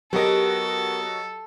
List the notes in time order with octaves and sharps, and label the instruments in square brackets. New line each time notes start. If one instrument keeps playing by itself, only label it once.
[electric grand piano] F#3 F#4 D#5 [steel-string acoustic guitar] B3 A#4 [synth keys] G4 [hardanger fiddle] A4